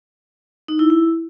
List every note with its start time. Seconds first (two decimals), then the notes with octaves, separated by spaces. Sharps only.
0.68 D#4
0.79 E4
0.90 E4